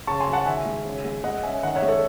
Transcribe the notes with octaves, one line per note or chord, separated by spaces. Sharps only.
C#3 A5 C#6
G#5 C6
F#3
F#5 A5
D#3 E5 G#5
G#3
C#3
G#3
G#3 D#5 F#5
C#4 E5 G#5
D#3 D#5 F#5
C#5 E5
G#3
A4 C#5